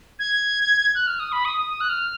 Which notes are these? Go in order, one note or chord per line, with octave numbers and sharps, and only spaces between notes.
G#6
F#6
F6
D#6
B5
D#6
D#6
D#6
F#6
F6